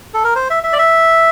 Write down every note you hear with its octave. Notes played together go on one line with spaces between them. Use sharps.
A4
A#4
C5
E5
E5
D5
E5